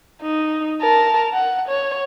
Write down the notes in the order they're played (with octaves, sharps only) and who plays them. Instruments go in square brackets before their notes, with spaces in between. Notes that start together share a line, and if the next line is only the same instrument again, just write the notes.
[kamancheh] D#4
A#4 A5
F#5
C#5